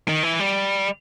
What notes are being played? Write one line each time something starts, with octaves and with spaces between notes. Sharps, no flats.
D#3
E3
G3